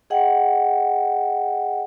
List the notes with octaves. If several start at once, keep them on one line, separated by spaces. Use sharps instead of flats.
G#4 D#5 F#5 G5